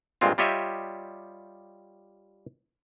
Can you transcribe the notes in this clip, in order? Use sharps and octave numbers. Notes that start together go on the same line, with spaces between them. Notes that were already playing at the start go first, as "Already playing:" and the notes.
G2 A#2 G#3 C4 F4
G3 F4 G4 C#5 D#5 E5